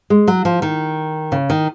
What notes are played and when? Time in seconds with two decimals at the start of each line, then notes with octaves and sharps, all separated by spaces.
0.10 G#3
0.28 F#3
0.45 F3
0.62 D#3
1.32 C#3
1.50 D#3